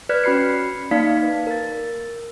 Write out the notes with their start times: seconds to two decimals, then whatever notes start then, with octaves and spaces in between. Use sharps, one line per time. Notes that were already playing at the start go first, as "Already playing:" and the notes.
0.09 B4 D5 F6 F#6 G#6 B6
0.24 C#4 F#4 B5 C7 C#7
0.91 A#3 D#4 D5 F5 B6
1.22 B4
1.47 A#4 A6